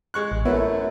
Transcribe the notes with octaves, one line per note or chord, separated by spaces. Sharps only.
G#3 C#6 F#6
A1
F#2 A3 B3 E4